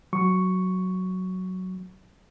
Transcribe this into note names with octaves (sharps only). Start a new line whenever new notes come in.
F#3 C#6